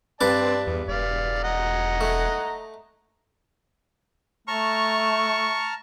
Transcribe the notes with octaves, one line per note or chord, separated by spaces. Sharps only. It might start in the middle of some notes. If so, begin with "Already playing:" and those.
G2 C4 B4 D5 A5 D6
E2
E1 D5 F5
D#5 F#5 A#5
A3
A3 A5 A#5 C#6 F6